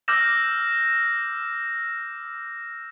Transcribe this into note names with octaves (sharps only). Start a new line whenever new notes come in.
D6 E6 F6 G6 A#6 E7